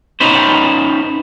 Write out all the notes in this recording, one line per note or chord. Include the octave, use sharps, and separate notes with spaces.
C#4 D#4 B4 C5